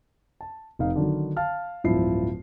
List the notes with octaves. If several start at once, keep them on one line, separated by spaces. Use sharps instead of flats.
A5
F1 D#4 F5
D3 D#3 F#3
F5 A5 F6
D1 G2 F3 E4 C7